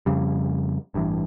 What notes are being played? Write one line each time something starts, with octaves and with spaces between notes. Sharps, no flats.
F2 C#3 G3
A1 G2 E3